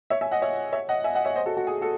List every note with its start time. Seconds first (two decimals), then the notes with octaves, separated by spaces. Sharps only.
0.10 C#5 E5
0.21 E5 G#5
0.31 D#5 F#5
0.42 C#5 E5
0.73 C#5 E5
0.89 D#5 F#5
1.04 E5 G#5
1.15 D#5 F#5
1.25 C#5 E5
1.35 C5 D#5
1.46 F#4 A4
1.57 F#4
1.67 G#4
1.82 F#4 A4